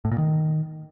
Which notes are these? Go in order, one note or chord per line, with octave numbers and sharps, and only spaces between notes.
A2
A#2
D#3